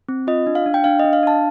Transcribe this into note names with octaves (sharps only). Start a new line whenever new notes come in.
C4
F4 D#5
D4
F5
D4
G5
D4 F5
D4 D#5
F5
D4 A5